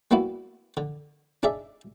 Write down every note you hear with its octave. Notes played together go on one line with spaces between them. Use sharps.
G3 A#3 B3 E4 F#4
D3
D4 D#4 G#4 D5 E5